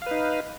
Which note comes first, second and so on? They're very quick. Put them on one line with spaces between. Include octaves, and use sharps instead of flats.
F5 B4 D#4